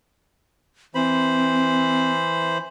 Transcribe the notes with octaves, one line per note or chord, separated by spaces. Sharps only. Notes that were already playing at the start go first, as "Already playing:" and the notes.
E3 C4 C5 B5